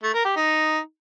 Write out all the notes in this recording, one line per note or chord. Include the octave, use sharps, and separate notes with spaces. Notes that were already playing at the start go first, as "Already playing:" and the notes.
A3
A#4
G4
D#4